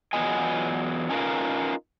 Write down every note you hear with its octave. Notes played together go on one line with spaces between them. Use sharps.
E2 F#3 B3 F4 D#5 G#5
C#4 D#4 F4 A#4 B4 F5